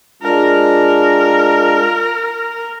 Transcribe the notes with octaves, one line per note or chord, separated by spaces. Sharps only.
G#3 D4 F4 A#4